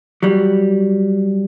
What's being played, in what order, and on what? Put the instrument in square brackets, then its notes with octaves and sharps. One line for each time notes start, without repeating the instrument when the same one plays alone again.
[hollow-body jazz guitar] F#3 G3